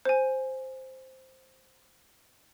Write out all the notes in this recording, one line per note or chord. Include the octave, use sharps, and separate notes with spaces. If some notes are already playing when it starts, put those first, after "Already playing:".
C5 G#5